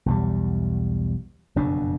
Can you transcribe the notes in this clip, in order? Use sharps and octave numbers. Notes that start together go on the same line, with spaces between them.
B1 E2 G3
F#1 F2 B2 D4